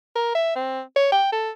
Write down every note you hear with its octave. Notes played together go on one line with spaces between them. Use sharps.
A#4
E5
C4
C#5
G5
A4